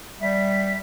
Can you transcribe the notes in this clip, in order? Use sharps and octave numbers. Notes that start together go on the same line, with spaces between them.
G3 E5